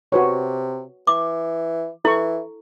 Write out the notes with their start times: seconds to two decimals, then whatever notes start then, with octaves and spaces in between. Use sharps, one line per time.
0.12 C3 F#4 B4 C#5
1.07 E3 D6
2.05 E3 E4 A4 C#6